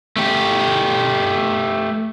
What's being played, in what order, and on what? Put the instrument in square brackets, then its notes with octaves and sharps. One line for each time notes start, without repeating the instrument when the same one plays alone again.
[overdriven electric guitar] A3 G4